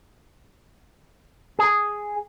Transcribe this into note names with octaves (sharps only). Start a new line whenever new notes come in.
G#4